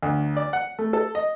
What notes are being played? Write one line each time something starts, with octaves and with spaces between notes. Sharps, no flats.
D2
D5
F#5
A3
A4
D#5